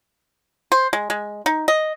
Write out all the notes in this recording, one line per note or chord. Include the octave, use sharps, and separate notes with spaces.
C5
G#3
G#3
D#4
D#5